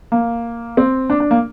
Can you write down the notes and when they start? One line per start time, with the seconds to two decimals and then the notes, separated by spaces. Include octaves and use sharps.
0.12 A#3
0.77 C4
1.10 D4
1.20 D4
1.31 A#3